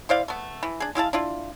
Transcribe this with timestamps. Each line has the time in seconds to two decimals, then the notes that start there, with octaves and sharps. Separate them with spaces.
0.09 E4 C5 D5 F5
0.28 A3 B3
0.63 E3
0.80 D4 G#4
0.95 G#3 E4 F5 A5
1.13 D4 E4 F4